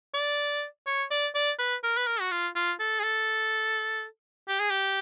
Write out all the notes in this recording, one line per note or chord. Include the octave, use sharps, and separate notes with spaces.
D5
C#5
D5
D5
B4
A#4
B4
A#4
F#4
F4
F4
A4
G#4
A4
G4
G#4
G4